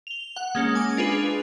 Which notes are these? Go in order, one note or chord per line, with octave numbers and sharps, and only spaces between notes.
F7 G7
F#5
G#3 A#3 C#4
G#5 D6
D4 F4 G#4 B4